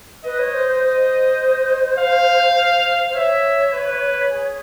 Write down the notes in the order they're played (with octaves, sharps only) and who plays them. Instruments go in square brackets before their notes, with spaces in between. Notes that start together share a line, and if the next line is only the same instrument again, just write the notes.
[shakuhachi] B4 [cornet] D#5
[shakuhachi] C#5
C5
C5
C5
[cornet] F5
[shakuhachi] C5
[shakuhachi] C#5 [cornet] E5
[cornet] B4
G#4